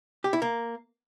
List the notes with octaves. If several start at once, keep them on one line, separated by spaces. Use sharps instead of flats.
G4
E4
A#3